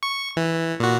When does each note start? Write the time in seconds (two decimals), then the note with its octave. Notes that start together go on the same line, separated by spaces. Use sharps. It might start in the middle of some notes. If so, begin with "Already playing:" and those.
0.03 C#6
0.37 E3
0.80 A#2 F#4